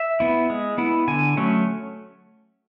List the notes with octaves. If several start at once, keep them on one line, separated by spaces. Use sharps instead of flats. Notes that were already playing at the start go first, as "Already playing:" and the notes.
Already playing: E5
B3 E4
G#3
B3 E4
D3 G#5
F#3 A3 C#4